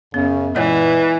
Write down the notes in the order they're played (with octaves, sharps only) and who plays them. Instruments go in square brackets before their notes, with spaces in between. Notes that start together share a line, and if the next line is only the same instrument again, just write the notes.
[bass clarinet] F#2 [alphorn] C#3 [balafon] B3
[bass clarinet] A#2 [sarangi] E3 [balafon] G#3 C#5 D#5 [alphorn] B4